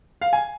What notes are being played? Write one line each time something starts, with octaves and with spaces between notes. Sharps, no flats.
F5
G#5